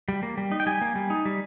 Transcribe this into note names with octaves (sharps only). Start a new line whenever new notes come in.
G3
A#3
G3
D#4
G5
G3 G#5
A#3
G3
D#4
G3